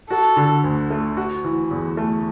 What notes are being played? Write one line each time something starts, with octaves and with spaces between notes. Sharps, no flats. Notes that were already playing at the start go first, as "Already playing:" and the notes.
F#4 A4
D3
D2
A3
F#4
E3
E2
A3